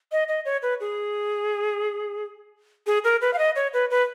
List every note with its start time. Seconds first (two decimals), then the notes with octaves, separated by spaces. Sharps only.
0.12 D#5
0.28 D#5
0.45 C#5
0.62 B4
0.80 G#4
2.87 G#4
3.04 A#4
3.21 B4
3.33 F5
3.38 D#5
3.56 C#5
3.73 B4
3.90 B4